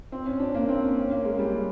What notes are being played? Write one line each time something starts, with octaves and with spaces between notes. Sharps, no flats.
C4
C#4
D4
A#3
C4
C#4
C#4
A#3
G#3
G3